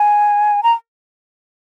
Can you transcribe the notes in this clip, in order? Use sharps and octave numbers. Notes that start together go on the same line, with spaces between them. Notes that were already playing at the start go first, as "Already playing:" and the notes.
Already playing: G#5
A#5